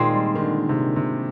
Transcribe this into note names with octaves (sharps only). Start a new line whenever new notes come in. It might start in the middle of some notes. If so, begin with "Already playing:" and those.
Already playing: A#2 D#3 G#3 C4
G3
D#3
D3
C3
C3